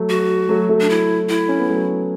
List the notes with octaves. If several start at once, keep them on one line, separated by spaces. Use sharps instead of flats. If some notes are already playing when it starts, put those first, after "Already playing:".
Already playing: F#3 A3
F#4
F#3 A3
F#3 A3
D4
E4
E4
C#4
B3
F#3 A3